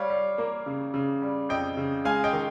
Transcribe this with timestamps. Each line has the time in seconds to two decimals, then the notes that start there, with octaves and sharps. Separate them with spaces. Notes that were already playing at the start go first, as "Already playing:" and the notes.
Already playing: G3 C#5 F5
0.10 G3
0.38 A#3
0.66 C#3
0.94 C#3
1.22 G3
1.49 F2 D#5 G5
1.77 C#3
2.05 G#3 F5 G#5
2.24 D#5 G5
2.33 D#3